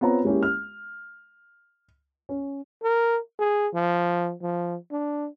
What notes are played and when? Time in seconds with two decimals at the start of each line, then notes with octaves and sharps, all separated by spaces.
0.01 B3 C4 F4 C#5 A#5
0.25 G#3 A#3 C#4 E4 G4
0.43 F6
2.29 C#4
2.83 A#4
3.39 G#4
3.74 F3
4.42 F3
4.92 D4